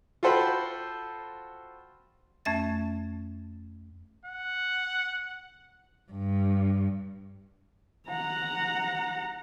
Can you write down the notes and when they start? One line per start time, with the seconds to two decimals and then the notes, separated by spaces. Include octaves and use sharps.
0.23 F4 F#4 A4 C5 G5 B5
2.45 F2 A3 C#4 E5 A6
4.25 F#5
6.11 G2
8.09 F#5 A#5